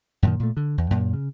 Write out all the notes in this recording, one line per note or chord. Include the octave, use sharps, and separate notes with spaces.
F#2 A#2 D#3
A#2 A3
D3
E2
F#2 A#2
C#3